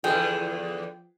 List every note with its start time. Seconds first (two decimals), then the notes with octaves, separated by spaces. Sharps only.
0.04 E2 D3 F3 G#4 B4 G5